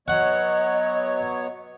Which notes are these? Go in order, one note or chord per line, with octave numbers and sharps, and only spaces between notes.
F#3 B3 C#5 D#5 F#5